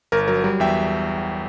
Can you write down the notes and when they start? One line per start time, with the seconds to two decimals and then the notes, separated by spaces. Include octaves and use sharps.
0.12 G1 A#4
0.28 F#3 A#4
0.44 G3 A#4
0.60 E2 E5 G5